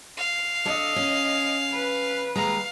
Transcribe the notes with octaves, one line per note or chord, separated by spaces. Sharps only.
F5
D4 A4 D#5
C#4
B4
D#2 G#3 F5 A#5